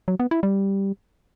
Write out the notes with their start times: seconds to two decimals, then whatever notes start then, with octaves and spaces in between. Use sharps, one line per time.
0.08 F#3
0.20 B3
0.31 E4
0.43 G3